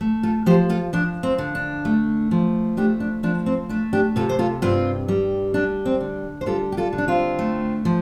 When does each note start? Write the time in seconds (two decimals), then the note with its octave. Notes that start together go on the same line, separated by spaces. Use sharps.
0.01 A3
0.23 F4 A4
0.46 F3 G4 C5
0.69 F4 A4
0.93 F3 D4
1.23 C4
1.38 D3
1.55 D4
1.85 A3
2.31 F3
2.77 A3 D4 G4
3.00 D4
3.23 F3 D4
3.46 C4
3.69 A3 D4
3.93 D4 G4
4.16 C3 F4 A4
4.29 C5
4.39 F4 A4
4.62 G2 C4 F4
5.08 G3
5.54 G3 D4
5.85 C4
6.00 D3
6.41 C5
6.46 G3 F4 A4
6.72 G4
6.77 F4 A4
6.93 D3
6.98 D4
7.08 C4 F4
7.39 A3
7.85 F3